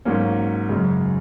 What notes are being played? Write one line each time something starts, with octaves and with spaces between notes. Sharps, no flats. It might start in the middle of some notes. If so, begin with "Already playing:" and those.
G#2 F#3 A#3 C#4
F#2 C#3 G#3